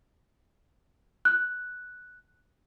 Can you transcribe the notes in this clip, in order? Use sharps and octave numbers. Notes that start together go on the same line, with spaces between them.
F#6